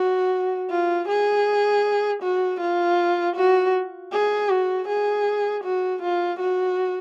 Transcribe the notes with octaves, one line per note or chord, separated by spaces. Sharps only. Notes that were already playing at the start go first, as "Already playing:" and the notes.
Already playing: F#4
F4
G#4
F#4
F4
F#4
G#4
F#4
G#4
F#4
F4
F#4